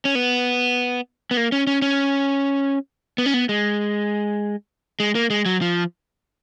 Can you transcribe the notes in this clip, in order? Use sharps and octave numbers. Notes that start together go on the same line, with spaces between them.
C#4
B3
B3
A#3
C#4
C#4
C#4
B3
C#4
B3
G#3
G#3
A#3
G#3
F#3
F3